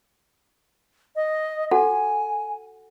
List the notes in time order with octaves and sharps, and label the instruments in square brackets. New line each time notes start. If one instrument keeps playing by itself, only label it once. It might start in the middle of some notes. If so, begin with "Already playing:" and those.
[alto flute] D#5
[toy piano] F#4 A4 F#5 [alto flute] G#5